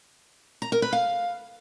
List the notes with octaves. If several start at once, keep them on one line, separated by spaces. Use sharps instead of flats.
A#5
A#4
B4
F5